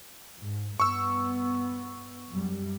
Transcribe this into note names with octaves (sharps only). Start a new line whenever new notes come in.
G#2
G2 B3 C#6 E6
F#2 G3